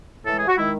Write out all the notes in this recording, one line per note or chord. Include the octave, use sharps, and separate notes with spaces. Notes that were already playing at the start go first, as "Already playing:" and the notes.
A2 E3 G#3 A4
G#4
F#4
D#3 G#3 E4